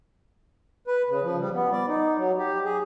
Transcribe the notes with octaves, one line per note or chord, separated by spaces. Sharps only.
B4
C#3
F3
G3
B3
D5
D#4
F#3
G4
G#4